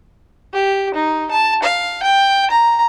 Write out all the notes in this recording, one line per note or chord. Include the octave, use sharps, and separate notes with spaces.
G4
D#4
A5
F5
G5
A#5